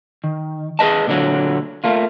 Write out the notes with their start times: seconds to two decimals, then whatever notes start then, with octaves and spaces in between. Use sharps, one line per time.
0.24 D#3
0.79 G#4 A4 B4 D#5 A5
1.07 A#2 D3 F#3
1.84 A3 A#3 F4